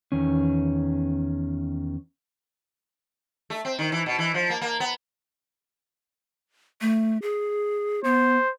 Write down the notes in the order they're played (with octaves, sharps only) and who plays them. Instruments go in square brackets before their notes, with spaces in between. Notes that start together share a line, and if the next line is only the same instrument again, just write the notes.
[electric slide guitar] E2 D#3 C#4
[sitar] A3
C4
D#3
E3
B2
E3
F3
A#3
A#3
B3
[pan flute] A3
G#4
[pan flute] B3 [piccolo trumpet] C5